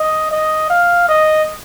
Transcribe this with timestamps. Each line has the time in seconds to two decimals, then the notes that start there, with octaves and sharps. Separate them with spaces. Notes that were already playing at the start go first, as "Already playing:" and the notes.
Already playing: D#5
0.31 D#5
0.70 F5
1.08 D#5